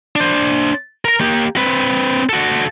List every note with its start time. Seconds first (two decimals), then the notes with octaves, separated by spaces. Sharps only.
0.16 D4 C5
1.05 A#4 A#5
1.20 A#3 G4
1.57 C4 B4
2.29 F#4 A4